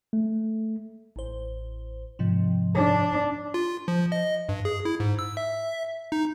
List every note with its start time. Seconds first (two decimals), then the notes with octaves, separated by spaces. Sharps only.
0.13 A3
1.16 A1 C5
2.19 G#2 C3 F3
2.75 D4
3.54 F4
3.88 F3
4.12 D#5
4.49 G2
4.65 G#4
4.85 E4
5.00 G#2
5.19 E6
5.37 E5
6.12 D#4